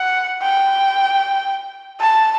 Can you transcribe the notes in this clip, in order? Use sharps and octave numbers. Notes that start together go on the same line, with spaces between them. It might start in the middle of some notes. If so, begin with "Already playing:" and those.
Already playing: F#5
G5
A5